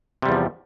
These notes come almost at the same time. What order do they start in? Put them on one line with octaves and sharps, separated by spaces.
C3 G3 E2 F3